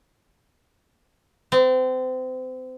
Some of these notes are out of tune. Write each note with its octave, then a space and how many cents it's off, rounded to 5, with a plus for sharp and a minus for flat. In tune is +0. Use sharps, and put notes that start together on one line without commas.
C4 -30